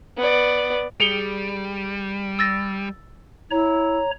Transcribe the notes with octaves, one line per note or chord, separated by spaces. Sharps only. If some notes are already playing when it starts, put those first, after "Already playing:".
B3 D5
G3 G#4 C#7 G7
E6 A6 A#6
E4 C#5 A#5